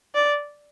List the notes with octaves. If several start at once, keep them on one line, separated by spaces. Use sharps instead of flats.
D5